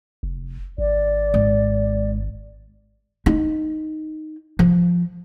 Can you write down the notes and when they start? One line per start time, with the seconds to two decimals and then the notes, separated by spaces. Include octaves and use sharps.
0.23 F1
0.78 G#1 D5
1.34 G#2
3.26 D#4
4.59 F3